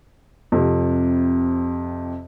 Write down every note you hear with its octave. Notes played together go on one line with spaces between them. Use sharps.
F2 C3